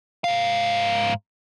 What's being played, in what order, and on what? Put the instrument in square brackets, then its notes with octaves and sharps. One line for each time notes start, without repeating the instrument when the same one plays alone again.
[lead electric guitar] G#2 F5